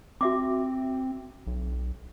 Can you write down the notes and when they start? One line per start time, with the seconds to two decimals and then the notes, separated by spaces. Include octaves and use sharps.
0.21 C4 F#4 E5 D6
1.47 B1